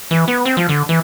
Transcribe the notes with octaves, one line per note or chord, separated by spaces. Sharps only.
E3
B3
C4
F3
D3
E3